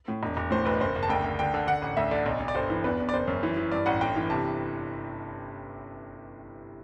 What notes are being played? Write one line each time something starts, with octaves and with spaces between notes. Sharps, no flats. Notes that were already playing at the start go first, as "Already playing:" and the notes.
A2
E1
E1
A2 C5
B1 B4
F#1 C5
F#1
A5
D2 G5
D2
D3 G5
D3
D3 F#5
A1
D2 E5
D3 D5
B1
B1
D5
G1 C5
E3
E2 B4
E2
D5
F#1 C5
F#2
E3
E3
G2 D5
A1 F#5
G1 G5
E3
C3 A5